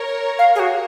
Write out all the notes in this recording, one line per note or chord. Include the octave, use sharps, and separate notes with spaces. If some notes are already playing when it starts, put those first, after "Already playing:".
Already playing: A#4 C#5
F5
G#4
F#4